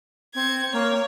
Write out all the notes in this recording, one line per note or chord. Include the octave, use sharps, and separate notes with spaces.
C4 G#6 C#7
A#3 C#5